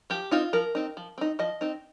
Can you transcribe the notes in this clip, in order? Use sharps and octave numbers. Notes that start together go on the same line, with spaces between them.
F3 G4
C4 D#4 F4
F3 A#4
C4 D#4
F3
C4 D#4
F3 D#5
C4 D#4